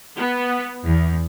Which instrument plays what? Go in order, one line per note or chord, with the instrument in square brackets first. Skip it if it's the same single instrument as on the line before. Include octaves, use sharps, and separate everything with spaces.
[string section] B3
E2